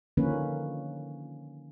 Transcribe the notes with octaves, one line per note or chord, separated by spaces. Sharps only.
D3 D#3 F3 A#3 C#4 B4